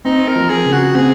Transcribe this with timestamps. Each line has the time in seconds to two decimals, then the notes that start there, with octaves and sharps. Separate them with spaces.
0.05 C4 D#4
0.27 A#4
0.36 F3
0.49 G#4
0.65 C#3
0.72 F#4
0.95 C4 G#4